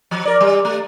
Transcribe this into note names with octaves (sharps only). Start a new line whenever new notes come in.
F3
A#4 D5
G3
A3